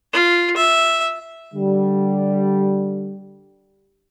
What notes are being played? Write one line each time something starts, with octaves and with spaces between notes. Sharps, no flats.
F4
E5
D3 G3